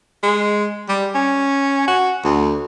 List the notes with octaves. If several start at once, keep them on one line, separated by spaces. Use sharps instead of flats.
G#3
G3
C#4
F#4
D2